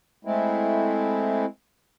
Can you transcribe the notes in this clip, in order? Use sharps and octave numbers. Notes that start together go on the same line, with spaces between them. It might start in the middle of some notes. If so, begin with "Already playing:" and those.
G#3 A3 C4 E4